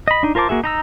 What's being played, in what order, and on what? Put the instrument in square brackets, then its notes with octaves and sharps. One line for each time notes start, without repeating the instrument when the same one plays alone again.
[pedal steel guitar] D#5 B5
D4 D#4
F4 A#4 C5 A5 D6
A#3 F#4 G#4 E5
D#4 A#5 E6